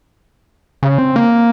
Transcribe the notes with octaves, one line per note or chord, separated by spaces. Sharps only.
C#3
C4
A#3